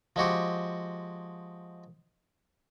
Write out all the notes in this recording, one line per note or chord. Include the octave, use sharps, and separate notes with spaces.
F3 G#3 F#4 G4